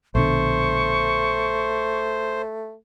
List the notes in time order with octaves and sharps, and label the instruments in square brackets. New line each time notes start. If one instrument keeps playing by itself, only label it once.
[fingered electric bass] A#1 B2 D3 [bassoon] A3 [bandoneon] C5 [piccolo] C#6